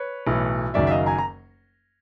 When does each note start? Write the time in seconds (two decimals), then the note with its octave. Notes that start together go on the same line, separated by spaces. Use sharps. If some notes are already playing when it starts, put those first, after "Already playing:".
Already playing: B4 C#5
0.27 B1 A2 E3
0.74 F#1 F#2 D#3 D5 E5
0.87 E5
0.90 D#5 F5
1.06 G#5 A#5
1.18 A#5